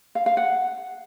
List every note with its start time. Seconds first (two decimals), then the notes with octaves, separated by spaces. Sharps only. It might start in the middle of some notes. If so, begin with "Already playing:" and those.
0.15 F5
0.26 F5
0.37 F#5